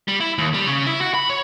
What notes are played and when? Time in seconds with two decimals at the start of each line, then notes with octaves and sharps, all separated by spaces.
0.08 G3
0.20 E4
0.38 D#2
0.54 G3
0.67 C#3
0.86 E4
1.01 F#4
1.14 B5
1.30 C#5